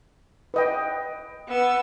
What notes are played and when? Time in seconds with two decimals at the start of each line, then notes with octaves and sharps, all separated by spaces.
0.54 B4 D#5 G5
1.48 B3 E6